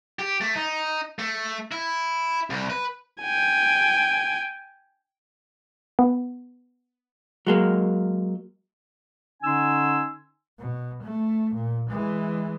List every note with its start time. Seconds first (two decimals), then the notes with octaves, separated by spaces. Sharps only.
0.19 G4
0.41 A3
0.56 D#4
1.19 A3
1.72 E4
2.50 C2
2.70 B4
3.22 G5 G#5
5.99 B3
7.47 F#3 G#3 A#3
9.43 D3 C#4 D#4 G#5 C6 E6
10.59 B2
11.03 A3
11.55 A#2
11.90 E3 G#3